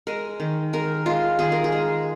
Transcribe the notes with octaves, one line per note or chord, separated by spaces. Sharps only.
G#3 A#4
D#3
G#3 A#4
G#3 F4
D#3 G#4
A#4
G#4
G#3